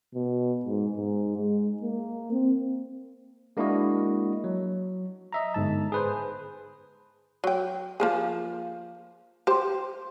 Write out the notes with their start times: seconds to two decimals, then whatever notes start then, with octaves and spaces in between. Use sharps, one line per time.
0.15 B2
0.65 G#2
0.97 G#2
1.37 G#3
1.83 A#3
2.32 C4
3.57 G#3 A#3 D4 E4 F#4 D#5
4.44 F#3
5.33 D#5 E5 A#5
5.54 G1 G#2 A5
5.92 G#4 B4 C5
7.44 F#3 G5
8.00 F3 A#3 G#4
9.47 G4 C5